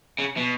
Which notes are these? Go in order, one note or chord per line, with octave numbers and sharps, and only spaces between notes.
C#3
B2